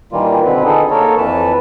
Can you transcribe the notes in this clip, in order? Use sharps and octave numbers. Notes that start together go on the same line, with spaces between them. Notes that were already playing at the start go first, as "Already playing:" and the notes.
A#2 D#3 E3 G3 A#3 F4
B2 D3 C4 B4
D3 D#4 G#4 A4
A#3 A4 A#4 C#5
F2 E3 B4 A5